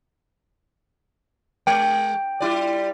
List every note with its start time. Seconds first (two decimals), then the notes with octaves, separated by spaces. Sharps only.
1.67 G#3 G5
2.40 G3 E4 D5